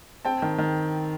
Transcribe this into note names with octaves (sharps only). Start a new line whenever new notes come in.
C4 G5 A5
D#3
D#3